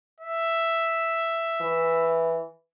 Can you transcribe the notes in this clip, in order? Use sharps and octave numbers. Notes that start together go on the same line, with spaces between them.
E5
E3